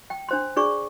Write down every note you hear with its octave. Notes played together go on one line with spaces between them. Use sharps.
G5
D4 C5 C6
D4 G#4 D5 C#6